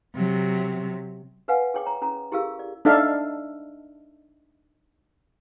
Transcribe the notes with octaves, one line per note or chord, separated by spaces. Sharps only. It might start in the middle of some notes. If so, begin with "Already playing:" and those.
C3 F#3
A4 B4 F5 F#5 G#5
G#4 A4 C#5 G5 D6
C#5 A#5
C#4 A4 A#5
E4 G4 G#4 A#4 F5 E6
D5
D4 D#4 A4 E5 F5